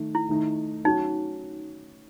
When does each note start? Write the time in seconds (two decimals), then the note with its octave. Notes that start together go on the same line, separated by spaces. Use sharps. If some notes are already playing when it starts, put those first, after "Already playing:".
Already playing: D#3 A3 D#4
0.15 E4
0.29 D#3 A3 D#4
0.84 F#3 C#4 D#4 F#4